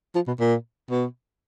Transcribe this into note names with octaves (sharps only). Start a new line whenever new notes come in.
F3
B2
A#2
B2